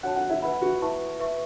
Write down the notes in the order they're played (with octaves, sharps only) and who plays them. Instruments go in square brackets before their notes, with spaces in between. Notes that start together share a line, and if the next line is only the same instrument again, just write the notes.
[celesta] F#4 C#5 A5 [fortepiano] F#5
[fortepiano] F#5
E4
[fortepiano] E4 [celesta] B4 F#5 B5
[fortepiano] F#4
[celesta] E4 B4 E5 A5 C#6
B4 E5 C#6